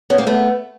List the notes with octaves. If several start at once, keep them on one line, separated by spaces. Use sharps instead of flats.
B3 C#4
A#3 C4
A3 B3